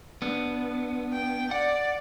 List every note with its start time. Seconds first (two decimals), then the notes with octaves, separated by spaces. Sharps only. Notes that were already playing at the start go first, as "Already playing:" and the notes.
0.22 B3 D4
1.13 G5
1.51 D5 F#5